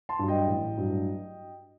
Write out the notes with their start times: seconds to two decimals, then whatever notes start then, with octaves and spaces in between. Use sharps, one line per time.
0.09 A5 C6
0.19 G2 F#3
0.28 D#5 G5
0.48 A1
0.77 G2 F#3